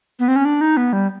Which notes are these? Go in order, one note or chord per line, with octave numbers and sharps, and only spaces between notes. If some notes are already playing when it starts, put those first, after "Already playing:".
B3
C4
C#4
D4
D#4
B3
G3